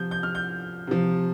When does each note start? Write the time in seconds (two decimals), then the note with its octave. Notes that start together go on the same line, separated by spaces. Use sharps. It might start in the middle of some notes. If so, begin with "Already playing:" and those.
Already playing: C3 F3 G6
0.11 G6
0.23 F6
0.35 G6
0.87 C3 F3